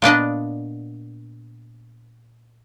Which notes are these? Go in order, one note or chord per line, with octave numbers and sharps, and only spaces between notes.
A#2 B3 D4 D#5